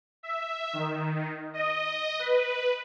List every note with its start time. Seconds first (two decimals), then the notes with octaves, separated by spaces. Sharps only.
0.23 E5
0.73 D#3
1.54 D#5
2.19 B4